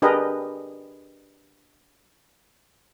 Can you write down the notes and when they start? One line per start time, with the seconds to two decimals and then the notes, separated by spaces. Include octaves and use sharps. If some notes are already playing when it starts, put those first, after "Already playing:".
0.02 D4 G4 G#4 A#4 B4 D#5